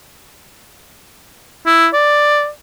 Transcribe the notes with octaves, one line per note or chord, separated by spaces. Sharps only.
E4
D5